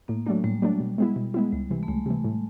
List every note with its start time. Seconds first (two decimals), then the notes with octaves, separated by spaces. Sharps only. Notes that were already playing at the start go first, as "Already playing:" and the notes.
0.08 A2 A#3
0.26 F#3 G#3 A3 D4
0.44 A2 G3
0.62 F#3 A3 D4
0.80 B2
0.98 G#3 B3 E4
1.16 B2
1.34 G#3 B3 E4
1.52 C#2 G3
1.70 C3 E3 G#3
1.83 A3
1.88 C#2 G#3
2.06 C3 E3
2.24 A2